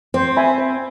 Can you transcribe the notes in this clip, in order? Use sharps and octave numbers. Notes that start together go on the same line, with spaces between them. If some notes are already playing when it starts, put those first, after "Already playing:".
C4 C5
E5 G#5 B5
C5